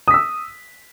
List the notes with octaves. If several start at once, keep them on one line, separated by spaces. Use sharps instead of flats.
D#6 E6 B6